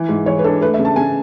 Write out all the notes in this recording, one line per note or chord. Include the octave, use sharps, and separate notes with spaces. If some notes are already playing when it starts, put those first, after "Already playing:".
Already playing: E3
G#2
E3 C#5
B4
D4 A4
A3 B4
E5
C#3
A5
C#3 G#5